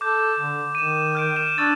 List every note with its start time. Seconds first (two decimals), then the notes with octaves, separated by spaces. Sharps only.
0.01 A4 D6 G6
0.39 D3
0.75 D#3 D#7 E7
1.15 F6 G6 D7
1.36 E7
1.58 D4 C#6 E6 A6